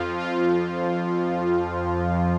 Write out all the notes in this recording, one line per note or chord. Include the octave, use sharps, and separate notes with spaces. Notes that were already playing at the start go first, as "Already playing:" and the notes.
Already playing: F2 F3 F4
F4